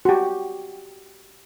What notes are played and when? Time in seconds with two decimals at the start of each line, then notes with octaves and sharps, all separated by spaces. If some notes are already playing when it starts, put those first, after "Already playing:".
0.05 F#4 G4